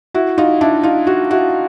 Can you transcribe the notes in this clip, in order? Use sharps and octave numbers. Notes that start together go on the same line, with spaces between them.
E4 F#4
D#4 F4
D4 E4
D#4 F4
F#4
E4 F#4